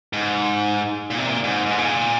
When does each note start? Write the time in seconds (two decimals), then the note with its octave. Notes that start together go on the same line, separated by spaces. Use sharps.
0.13 G#2
1.10 A#2
1.18 C3
1.26 A#2
1.44 G#2
1.66 G#2
1.78 A#2